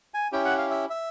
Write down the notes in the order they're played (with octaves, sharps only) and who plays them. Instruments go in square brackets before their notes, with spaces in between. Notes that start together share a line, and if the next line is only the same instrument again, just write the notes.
[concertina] G#5
C#4 E4 G4 G5
F#5
F5
E5
E5